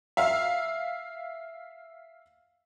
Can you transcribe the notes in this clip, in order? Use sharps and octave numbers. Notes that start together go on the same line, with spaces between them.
E5 F5